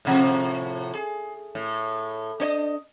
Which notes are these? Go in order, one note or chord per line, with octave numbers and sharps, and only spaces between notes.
A2 C3 F3
G#4
A2
D4 C#5 D#5